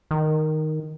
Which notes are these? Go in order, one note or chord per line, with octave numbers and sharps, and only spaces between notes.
D#3